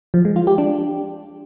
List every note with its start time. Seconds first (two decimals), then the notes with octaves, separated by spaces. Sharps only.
0.14 F3
0.25 G#3
0.36 F4
0.47 G4
0.58 D4